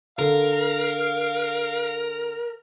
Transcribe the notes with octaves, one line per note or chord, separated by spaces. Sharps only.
D3 A#4 F5